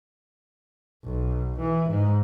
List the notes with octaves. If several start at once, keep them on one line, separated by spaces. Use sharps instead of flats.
B1
E3
G#2